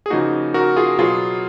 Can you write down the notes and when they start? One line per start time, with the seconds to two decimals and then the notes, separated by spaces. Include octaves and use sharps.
0.06 G#4
0.10 C#3 F3 A#3 D#4 F#4
0.54 F#4 A#4
0.76 F4 G#4
0.98 B2 F#3 B3 F4 G#4